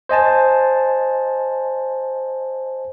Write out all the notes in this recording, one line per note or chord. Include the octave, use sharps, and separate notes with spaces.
C5 D#5 G#5 A5